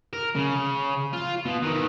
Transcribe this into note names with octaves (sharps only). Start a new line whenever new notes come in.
A#4
C#3
F4
B2
D#3 E3